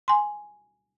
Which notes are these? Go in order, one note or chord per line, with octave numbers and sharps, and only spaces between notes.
G#5 C6